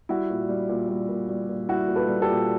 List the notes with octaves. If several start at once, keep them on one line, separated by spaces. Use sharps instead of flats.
G3 E4 F#4
A#2
G3
A#2
G3
A#2
G3
A#2
G3 E4 F#4
A#2
A4 B4
G3
G4 A4
A#2